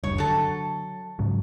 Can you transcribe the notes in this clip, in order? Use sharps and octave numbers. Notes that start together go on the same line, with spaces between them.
F#1 D2 G2 C#5
D3 F#3 A4
G#2 C#3 F#3